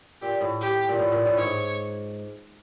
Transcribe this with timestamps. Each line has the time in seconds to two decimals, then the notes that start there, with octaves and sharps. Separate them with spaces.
0.22 A#2 G4
0.41 A2
0.61 G4
0.89 A#2
0.99 A2
1.12 A#2
1.26 A2
1.37 G#2 C#5